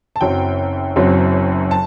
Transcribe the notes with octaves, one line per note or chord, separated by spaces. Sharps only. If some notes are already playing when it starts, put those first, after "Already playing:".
A5
F#1 F#2 F#3 C4 G5
F#1 F#2 F#3 C4
A5